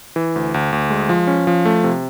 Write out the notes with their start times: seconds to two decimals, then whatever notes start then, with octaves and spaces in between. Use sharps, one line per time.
0.16 E3
0.36 D2
0.54 D2
0.73 D2
0.90 G#3
1.09 F3
1.27 C#4
1.47 F3
1.65 A3
1.84 C3